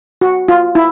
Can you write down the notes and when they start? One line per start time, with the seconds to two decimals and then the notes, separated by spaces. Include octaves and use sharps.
0.21 F#4
0.48 F4
0.75 E4